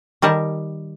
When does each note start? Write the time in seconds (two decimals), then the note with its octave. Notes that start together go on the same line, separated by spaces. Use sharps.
0.22 D#3 G3 A#4 A5